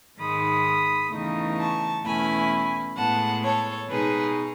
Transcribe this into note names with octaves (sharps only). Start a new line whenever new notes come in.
G#2 D#3 G#3 B5 D#6
E2 C#3 E3 A3 D#4
A5 C#6
E2 B2 A3 C#4 E4 G#5 B5
A2 G#3 B3 F#5 A5
A4 C#5
B2 G#3 D#4 G#4 B4